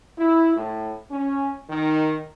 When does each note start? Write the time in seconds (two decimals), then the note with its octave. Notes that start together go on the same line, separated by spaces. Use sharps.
0.17 E4
0.57 A2
1.11 C#4
1.70 D#3